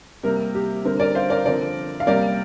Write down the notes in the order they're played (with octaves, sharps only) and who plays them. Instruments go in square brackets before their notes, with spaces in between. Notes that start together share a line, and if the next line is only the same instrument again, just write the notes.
[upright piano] C3 G3 A#3 A#4
G4
D3 G3 C4 A#4
A#4 D5
C5 F5
A#4 D5
D3 F3 C4 A#4 D5
F5
C3 G3 A#3 A#4 D5